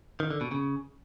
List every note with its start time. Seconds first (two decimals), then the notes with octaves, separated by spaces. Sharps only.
0.20 D#3
0.31 D3
0.41 B2
0.51 C#3